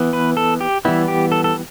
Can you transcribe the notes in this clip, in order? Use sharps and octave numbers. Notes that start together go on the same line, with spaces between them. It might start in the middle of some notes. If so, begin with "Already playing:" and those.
Already playing: E3 B3
B4
A4
G4
E3 G3 B3 E4
G4
A4
A4